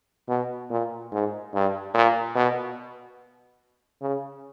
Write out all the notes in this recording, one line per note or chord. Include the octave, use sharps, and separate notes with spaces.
B2
A#2
G#2
G2
A#2
B2
C#3